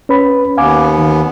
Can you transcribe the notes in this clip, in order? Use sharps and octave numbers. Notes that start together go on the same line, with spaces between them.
C#4 B4 B5
D#2 B3 F5 G#5 D6
D#3